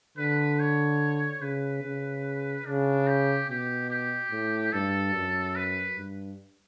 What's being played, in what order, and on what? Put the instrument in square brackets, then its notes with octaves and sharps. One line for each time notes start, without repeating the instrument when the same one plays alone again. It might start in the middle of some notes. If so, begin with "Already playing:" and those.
[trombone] D3 [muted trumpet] B4
[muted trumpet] C#5
[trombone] C#3 [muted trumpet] B4
[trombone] C#3
[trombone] C#3 [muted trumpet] D4
[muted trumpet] G4
[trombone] B2 [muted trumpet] G4
[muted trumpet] G4
[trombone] A2
[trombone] G2 [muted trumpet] A4
[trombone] F#2
[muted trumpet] B4
[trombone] G2